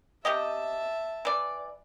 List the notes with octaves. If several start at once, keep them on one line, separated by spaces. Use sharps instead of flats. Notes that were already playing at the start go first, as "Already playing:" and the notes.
C3 G4 D#5 E5 A5
E3 D5